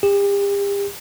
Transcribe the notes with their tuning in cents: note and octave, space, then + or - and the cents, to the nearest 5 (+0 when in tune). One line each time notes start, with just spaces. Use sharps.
G4 +40